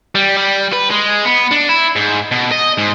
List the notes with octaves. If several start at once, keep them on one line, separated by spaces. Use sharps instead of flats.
G3
G3
B4
G#3
B3
D4
E4
G#2
B2
D#5
G#2